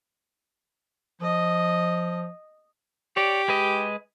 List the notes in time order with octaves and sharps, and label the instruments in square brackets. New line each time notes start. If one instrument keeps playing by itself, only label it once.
[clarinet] F3 [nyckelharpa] D#5
[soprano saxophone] G4 [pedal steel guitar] C#5 D5
[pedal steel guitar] G#3 B4 D#5